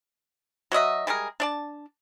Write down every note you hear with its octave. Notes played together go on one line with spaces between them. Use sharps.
F#3 F#4 D#5 E5
G3 G#3 G#4 A#4
D4 D5 A5